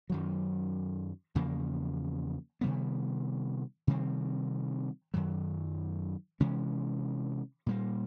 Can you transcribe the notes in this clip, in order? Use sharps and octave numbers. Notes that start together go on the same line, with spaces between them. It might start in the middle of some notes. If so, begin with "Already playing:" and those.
F#2 D#3 F#3
E2 C#3 F3 A#3
C3 D#3 G3 B3
C3 D#3 G3 C4
F#2 D#3 F#3
C3 E3 G#3 C#4
A#2 G3 A#3